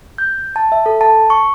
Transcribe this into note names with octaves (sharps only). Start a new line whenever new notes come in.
G6
A5
E5
A4
A5
C#6